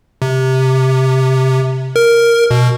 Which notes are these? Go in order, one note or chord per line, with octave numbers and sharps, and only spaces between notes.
C3
A#4
B2